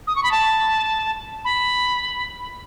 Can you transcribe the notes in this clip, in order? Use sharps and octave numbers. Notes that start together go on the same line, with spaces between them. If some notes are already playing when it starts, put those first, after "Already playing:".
D#6
C#6
B5
A5
B5